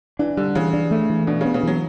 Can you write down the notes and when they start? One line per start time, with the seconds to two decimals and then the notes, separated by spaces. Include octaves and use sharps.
0.19 E3 D4
0.37 D3 G3
0.55 C#3 E3
0.73 D4
0.91 A3
1.10 E3
1.27 B2 D4
1.41 C#3
1.45 B3
1.54 C#3
1.63 E3 F#3